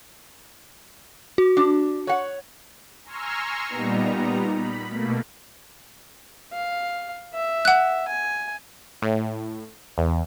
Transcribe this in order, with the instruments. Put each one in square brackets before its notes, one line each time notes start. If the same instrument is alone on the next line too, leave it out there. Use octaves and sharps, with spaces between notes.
[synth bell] F#4
[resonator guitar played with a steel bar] D4
C#5 F#5
[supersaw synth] G#5 A#5 C6 C#6 E6 F6
A#2 G3 B3 D#4 A#5
B5
B2 A3 A#3
[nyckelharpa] F5
E5
[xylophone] F#5 F#6
[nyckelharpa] G#5
[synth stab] A2
E2